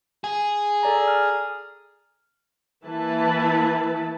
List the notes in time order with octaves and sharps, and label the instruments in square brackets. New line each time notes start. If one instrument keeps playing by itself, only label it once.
[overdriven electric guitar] G#4
[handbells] A4 D5 A#5
F6
[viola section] E3 A#3 E4 B4 A5